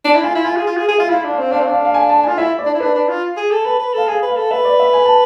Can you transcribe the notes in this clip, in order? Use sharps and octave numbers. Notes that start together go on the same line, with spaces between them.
D4
E4
F4 G#5
E4
F4 G#5
G#4
F4
G#4
G#4
F4 E5
E4 F5
D4
F5
C4
D4 F5
C4
D4
F5
F5
G#5
A5
G#5
F4
E4 E5
D5
D4
E4
D4 B4
D4
F4
G#4
A4
B4 A5
B4
A4 F5
G#4 G#5
B4
F5
A4
B4 E5
D5
E5
G#5
A5